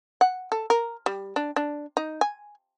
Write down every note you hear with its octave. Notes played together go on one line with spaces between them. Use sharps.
F#5
A4
A#4
G3
D4
D4
D#4
G#5